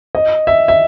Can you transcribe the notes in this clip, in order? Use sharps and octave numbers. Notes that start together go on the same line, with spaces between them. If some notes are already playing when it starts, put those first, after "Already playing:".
D#5
E5
E5